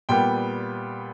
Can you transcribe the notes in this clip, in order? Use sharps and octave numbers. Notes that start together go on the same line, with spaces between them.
A#2 G3 B3 G5